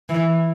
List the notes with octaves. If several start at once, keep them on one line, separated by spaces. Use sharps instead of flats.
E3